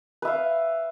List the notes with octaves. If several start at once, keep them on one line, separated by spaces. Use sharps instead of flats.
B4 E5 F5